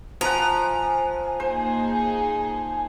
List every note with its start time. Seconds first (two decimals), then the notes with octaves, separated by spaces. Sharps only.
0.21 F3 F#5 G#5 A#5
1.40 A#3 D#4 G#4 C5